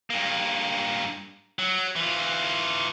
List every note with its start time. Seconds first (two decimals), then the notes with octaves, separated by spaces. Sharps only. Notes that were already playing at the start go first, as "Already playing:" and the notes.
0.10 G2 A#3
1.59 F#3
1.96 E3 F4